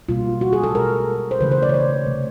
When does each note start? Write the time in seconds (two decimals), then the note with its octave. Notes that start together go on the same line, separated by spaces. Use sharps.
0.09 B2 G3 A#3 F4
0.41 F#4
0.53 G#4
0.64 A4
0.74 B2 G#3 A#4
1.31 C5
1.41 C#3 E3 A3 B4
1.51 C5
1.62 D5
1.69 C#5
1.74 C5
2.06 C3 E3 A3